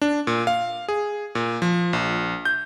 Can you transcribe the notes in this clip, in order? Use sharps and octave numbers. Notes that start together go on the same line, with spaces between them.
D4
A#2
F5
G#4
A#2
F3
A#1
G6